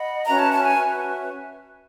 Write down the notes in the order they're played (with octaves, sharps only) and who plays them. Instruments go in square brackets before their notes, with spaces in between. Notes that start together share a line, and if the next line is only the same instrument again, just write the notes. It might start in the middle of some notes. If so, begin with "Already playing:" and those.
Already playing: [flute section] D#5 F#5 B5
[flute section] C#4 F#4 B4 E5 [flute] A#5
[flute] A5
A5
G#5
[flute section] C#4 F#4 B4 E5